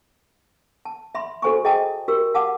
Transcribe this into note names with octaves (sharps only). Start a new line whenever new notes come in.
A5
E5 B5 C6
F#4 A4 C5 G#5 A#5 C#6
G#4 D#5 G5 A5 A#5 D#6
F#4 G4 A#4 E6
F5 F#5 A5 D6 D#6